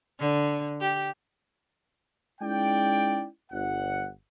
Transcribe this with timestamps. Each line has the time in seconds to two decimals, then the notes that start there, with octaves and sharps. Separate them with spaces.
0.19 D3
0.81 G4
2.41 G#3 C#4 D#4 E4 D5 G5
3.52 G1 F#5